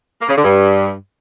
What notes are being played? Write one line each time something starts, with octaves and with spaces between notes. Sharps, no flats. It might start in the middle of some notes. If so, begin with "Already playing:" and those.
A#3
C#3
D3
G2